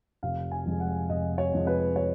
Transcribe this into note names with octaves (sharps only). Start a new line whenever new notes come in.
F1 F5
G#5
F2 F3 G#3
F#5
F1 D#5
C#5
F2 F3 G#3
B4
C#5